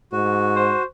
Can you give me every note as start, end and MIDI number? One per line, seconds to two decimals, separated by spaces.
0.12 0.73 44
0.12 0.83 66
0.56 0.84 72